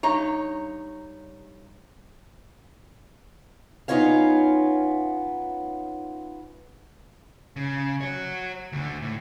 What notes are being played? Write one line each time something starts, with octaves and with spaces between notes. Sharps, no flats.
G2 D#4 C#5 A#5
B3 C#4 D#4 F4 C#5 F5
C#3
F#4 C#5
D2 D3
A2